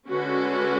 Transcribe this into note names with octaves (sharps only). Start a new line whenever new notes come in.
D3 G#3 C#4 F#4 B4